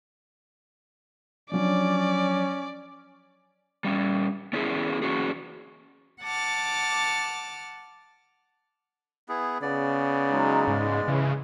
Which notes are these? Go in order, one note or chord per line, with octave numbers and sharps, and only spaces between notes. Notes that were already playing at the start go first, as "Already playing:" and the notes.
F3 F#3 C#4 D4 D5
G3 C#4
B3 C#4 E4 G#4
E2 E3 C#4 F#4 G#4
F#5 A5 D6 F6
B3 E4 G#4
C#3 B3 D5
F#3 G#3 D#4
G#2 G#3
C#3 E3